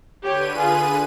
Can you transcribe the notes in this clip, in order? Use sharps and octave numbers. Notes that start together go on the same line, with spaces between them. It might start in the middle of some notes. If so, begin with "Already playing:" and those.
D3 G4 B4 C#5 D#7
F4 G#4 G#5